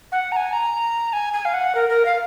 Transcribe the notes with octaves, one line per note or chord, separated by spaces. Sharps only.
F#5
A#5
G#5
A#5
G#5
G#5
F5
F#5
A#4
A#4
F5